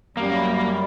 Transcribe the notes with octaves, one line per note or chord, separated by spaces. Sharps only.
F#2 G3 A#3